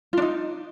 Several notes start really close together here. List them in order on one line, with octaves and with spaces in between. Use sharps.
F4 D4 D#4